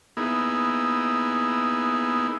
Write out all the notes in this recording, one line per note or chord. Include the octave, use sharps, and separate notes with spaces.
A#3 B3 D#4 E4 G#4